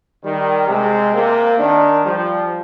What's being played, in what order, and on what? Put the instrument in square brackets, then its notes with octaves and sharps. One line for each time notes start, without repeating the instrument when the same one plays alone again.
[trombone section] D#3 [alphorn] G3
[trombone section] C3 [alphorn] G#3
[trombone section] C3 [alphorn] A#3
[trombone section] D#3 [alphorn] D4
[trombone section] F3 [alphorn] G3